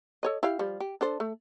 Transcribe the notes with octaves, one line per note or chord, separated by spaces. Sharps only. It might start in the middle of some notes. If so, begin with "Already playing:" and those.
A4 C#5 D#5
E4 G4 F5
F3 G3
G4
D4 A4 C5
A3